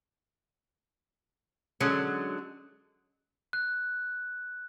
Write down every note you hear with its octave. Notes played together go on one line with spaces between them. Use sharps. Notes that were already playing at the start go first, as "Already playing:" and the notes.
D3 F#3 G#3 C#4
F#6